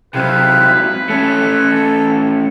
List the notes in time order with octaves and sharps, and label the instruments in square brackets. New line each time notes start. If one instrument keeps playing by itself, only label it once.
[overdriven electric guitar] C3 F#3 [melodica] C4 E4 F5 [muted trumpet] B4
[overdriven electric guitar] A3 C#4 [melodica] A4